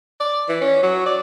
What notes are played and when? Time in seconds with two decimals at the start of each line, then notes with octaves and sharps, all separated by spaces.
0.20 D5
0.48 E3
0.61 C#4
0.83 F#3
1.06 D5